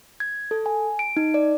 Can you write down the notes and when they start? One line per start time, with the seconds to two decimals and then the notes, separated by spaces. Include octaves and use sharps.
0.20 G#6
0.51 A4
0.66 G#5
0.99 D7
1.17 D#4
1.34 D5